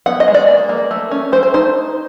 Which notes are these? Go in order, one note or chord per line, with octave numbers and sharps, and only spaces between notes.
B3 F#5
D#5
G#3
D5
A#3
A#3
A3
C#4
A3 C5
C5
D#4 C5